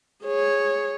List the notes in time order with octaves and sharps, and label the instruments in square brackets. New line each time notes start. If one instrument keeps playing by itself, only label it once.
[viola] G#4 C#5